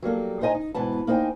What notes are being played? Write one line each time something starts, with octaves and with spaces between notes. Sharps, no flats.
F#3 G3 A#3 A4
A#2 D#4 C5 D#5 G#5 A#5
D#4
G#2 B2 E3 B3 A5
A#3 D#4 C5 D#5 G5 G#5